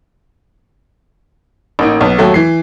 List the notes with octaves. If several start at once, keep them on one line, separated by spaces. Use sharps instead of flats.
A1 A#3 D#4
B1 B3
D#2 F#3 A3
E3 C7